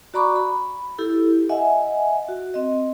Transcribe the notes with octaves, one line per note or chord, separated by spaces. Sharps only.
F#4 D5 A#5 B5 C#6 D6
B5
E4 G4 A4
D#5 E5 F#5 G#5
F#4
C4 D#5